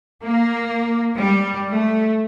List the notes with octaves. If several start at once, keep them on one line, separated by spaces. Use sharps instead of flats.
A#3
G3
A3